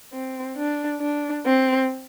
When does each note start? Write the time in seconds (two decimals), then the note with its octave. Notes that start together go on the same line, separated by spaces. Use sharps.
0.13 C4
0.56 D4
1.00 D4
1.45 C4